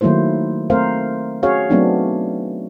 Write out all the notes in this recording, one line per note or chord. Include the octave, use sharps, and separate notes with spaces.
D#3 F#3 A3 A#3 E4 C5
A3 C4 A#4 C5 F5
C#4 F#4 G#4 C#5 F5
F#3 A3 B3 C4 D4 D#4